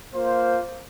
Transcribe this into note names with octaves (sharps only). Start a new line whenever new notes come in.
A#3 F4 C5 F5